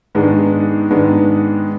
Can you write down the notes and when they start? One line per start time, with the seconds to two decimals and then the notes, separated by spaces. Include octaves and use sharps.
0.15 G#2 D#3 G#3 B3 D4
0.91 G#2 D#3 G#3 B3 D4